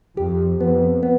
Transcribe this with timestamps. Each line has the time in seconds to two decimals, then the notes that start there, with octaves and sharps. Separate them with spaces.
0.17 F2 G4
0.60 F2 B3
1.03 B3